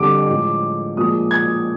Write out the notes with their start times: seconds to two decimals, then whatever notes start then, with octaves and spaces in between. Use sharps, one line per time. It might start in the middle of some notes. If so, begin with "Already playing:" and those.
Already playing: F2 D3 G3 D6
0.28 A2 F3 G#3
0.97 A#2 F3 G#3 D#6
1.31 G#6